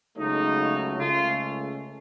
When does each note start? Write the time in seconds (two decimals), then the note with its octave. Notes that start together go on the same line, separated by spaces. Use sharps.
0.17 C#2 C#3 F#3 A3 D#4
0.98 C#2 C#3 A3 F4